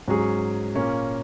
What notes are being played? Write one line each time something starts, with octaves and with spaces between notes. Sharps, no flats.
G#2 F#3 C#4 G#4
A#2 A#3 C#4